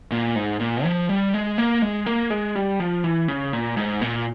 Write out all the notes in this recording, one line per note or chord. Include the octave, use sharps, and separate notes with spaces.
A#2
G#2
A#2
F3
G3
G#3
A#3
G#3
A#3
G#3
G3
F3
E3
C#3
A#2
G#2
A#2